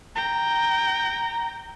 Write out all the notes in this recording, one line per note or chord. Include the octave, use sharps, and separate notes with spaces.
G5 A#5